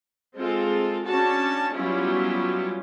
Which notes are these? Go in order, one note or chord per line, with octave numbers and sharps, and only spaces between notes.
G#3 C4 F4 A4
C#4 D4 F#4 A5
F#3 G3 B3 C#4 E4 F4